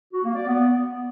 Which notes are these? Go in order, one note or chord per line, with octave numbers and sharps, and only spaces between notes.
F#4
A#3
D5
B3